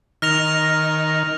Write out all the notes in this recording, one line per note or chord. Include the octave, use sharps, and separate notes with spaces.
D#3 F6 A#6 F7